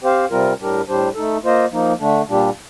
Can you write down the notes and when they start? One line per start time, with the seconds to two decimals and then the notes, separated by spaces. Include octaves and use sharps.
0.03 C4 G4 C5 F5
0.30 C3 G3 C4 F4 A#4
0.59 A2 G3 D4 G4 A#4
0.87 A2 G3 D4 G4 C5
1.14 A3 D#4 A4
1.44 A#3 F4 C5 D#5
1.71 F3 A#3 D#4
1.99 D3 A3 D4
2.27 A#2 G3 D4 G4